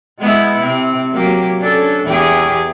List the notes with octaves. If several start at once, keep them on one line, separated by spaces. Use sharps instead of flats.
G#3 B3 E4
C3 C4
F#3 A#3 G4
C#4 D4 A4
E2 G4 G#4